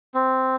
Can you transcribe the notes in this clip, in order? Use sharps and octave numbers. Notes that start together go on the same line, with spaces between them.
C4